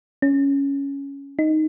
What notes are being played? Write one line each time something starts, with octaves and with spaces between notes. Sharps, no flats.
C#4
D#4